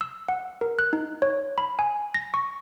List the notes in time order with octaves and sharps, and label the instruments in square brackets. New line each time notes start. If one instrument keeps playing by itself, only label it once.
[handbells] E6
F#5
A#4
F#6
D#4
C#5
B5
G#5
A#6
C#6